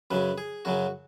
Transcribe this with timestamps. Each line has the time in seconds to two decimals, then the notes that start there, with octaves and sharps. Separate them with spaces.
0.11 F#2 C#3 F#3 B4
0.38 G#4
0.65 F#2 C#3 F#3 F#4